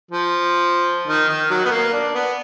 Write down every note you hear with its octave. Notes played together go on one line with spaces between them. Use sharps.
F3
D#3
D#3
F#3
B3
A#3
D4
B3